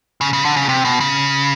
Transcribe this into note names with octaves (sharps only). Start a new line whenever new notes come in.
C#3
C#3
D3
C#3
C3
B2
C#3